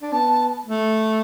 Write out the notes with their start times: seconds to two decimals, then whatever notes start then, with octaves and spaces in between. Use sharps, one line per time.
0.02 D4
0.12 B3 A5
0.66 A3